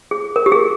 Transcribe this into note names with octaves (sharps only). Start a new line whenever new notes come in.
G#4
A#4
G4
G#4